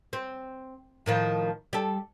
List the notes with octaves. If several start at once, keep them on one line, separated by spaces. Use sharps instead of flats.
C4
A2 D#3 F3
G3 A4